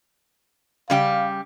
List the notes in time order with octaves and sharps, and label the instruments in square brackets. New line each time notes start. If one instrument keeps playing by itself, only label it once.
[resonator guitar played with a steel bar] C#3 G3 G4 [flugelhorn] F5